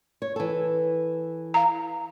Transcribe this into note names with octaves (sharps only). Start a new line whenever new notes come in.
C#5
E3 A4
F5 A#5